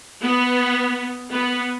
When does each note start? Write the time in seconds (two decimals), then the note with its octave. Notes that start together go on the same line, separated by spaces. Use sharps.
0.23 B3
1.31 B3